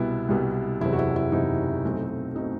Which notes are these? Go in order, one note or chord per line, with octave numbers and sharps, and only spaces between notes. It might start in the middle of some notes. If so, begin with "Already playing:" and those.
Already playing: C2 B2 G3 B3 E4
C2 B2 G3 B3
F#1 E2 C3 E4
F#4
E4
E4
F#1 E2 C3 D#4
B1 B2 A3 C4
B2 A3 C4 D#4